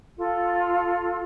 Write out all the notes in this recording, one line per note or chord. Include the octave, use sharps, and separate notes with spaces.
F4 A4